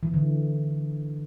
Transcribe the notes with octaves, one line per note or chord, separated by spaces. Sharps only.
E3
D3